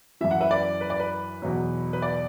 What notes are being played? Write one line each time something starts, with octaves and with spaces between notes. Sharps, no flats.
F#2 E3 E5
F#5
B4 E5
D5
B4
D5
B4
E2 B2 F#3
B4
D5